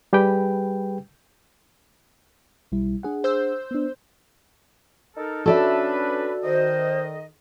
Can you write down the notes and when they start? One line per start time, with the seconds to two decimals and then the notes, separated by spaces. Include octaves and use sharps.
0.13 G3 G4 G#4 B4 G5
2.72 B1 G3 E4
3.03 D4 G#4 F#5
3.24 C5 E6 G6
3.71 B3 D4
5.17 D#4 A4 A#4
5.46 C#4 D4 F#4 A4 B4 D5 E5
6.43 D#3 C5 D#5